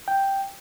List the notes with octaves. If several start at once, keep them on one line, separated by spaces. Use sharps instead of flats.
G5